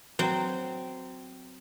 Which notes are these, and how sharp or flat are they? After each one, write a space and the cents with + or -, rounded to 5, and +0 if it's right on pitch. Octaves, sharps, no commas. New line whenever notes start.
F#3 +0 C4 -15